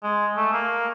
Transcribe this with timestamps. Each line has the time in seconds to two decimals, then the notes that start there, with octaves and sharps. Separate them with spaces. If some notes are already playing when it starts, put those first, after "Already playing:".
0.03 G#3
0.37 A3
0.53 A#3